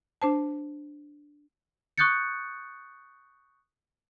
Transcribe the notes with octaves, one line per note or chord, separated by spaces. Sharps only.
D4 C5 A5
C#6 D#6 F#6 G6 A6 C#7